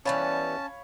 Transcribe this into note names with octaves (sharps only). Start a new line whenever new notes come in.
E3 G3 B3 C#4 C#5 F5 A5 B5